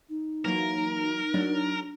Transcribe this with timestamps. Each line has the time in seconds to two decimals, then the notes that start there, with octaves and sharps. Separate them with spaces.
0.09 D#4
0.45 E3 F#3 A#3 A#4
1.34 F#3 D4